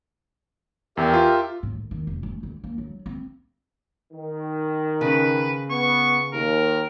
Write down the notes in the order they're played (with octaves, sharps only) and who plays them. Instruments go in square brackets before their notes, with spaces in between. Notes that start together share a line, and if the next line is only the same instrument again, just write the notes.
[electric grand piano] E2 [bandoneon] G4 A#4 E5
[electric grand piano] F4
[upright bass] A2
D#3
D#3
F1
A3
D3
A#3
F#3
C4
[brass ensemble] D#3
[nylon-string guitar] C#3 [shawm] B4
[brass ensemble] B3 [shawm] C#6
[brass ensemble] D#2 [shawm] A#4